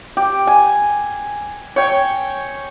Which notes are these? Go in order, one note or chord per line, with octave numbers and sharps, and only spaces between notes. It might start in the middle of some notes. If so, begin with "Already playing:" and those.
G4
G#5
C#5 G5